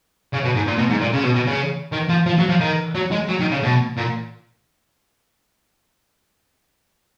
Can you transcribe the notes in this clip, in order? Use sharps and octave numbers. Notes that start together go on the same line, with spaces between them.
C#3
B2
G#2
A#2
B2
G#2
A#2
C#3
B2
B2
C#3
D#3
F3
F3
F#3
F3
D#3
F#3
G#3
F#3
D#3
C#3
B2
A#2